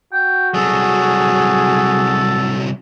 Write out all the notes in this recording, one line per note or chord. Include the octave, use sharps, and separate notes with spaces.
F#4 G5
C2 F#3 G#4 A4